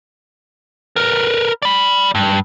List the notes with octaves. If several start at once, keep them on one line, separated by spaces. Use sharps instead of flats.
A#4 B4
D5 B5
G2